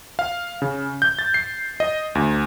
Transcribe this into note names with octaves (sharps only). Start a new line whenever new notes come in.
F5
C#3
G6
A6
C7
D#5
D2